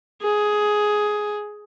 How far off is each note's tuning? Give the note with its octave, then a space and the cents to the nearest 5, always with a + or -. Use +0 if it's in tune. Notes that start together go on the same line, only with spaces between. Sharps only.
G#4 +10